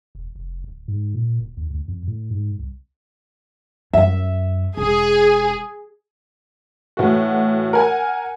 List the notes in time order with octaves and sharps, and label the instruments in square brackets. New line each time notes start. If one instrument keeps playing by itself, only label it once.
[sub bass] E1
F1
D1
G#2
A#2
D1
D#2
D2
F2
A2
G#2
C2
[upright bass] F#2 [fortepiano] E5
[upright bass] E1 [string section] G#4
[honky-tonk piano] A2 E3 F#4
A#4 F#5 G#5